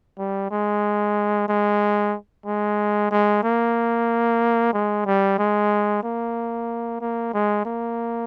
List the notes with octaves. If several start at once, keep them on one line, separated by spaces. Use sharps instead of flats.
G3
G#3
G#3
G#3
G#3
A#3
G#3
G3
G#3
A#3
A#3
G#3
A#3